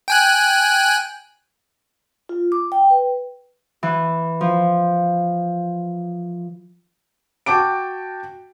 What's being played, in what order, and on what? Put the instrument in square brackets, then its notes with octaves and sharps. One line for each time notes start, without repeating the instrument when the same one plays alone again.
[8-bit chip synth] G5 G#5 F#6
[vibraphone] F4
D6
G5
B4
[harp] E3
F3
[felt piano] F#4 G5 A5 D6 D7